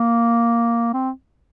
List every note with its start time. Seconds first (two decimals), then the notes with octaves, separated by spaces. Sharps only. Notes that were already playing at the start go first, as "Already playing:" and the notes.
Already playing: A#3
0.94 C4